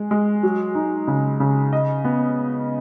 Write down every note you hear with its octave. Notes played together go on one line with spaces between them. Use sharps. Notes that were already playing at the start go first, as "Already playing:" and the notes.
Already playing: G#3
G#3
F#3
D#4
C#3
C#3
D#5
B3